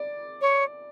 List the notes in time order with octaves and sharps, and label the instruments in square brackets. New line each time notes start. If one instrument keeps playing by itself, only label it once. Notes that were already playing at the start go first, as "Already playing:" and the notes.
Already playing: [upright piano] D5
[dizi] C#5